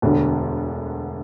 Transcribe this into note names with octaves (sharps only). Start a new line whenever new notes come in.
E1 D2 D3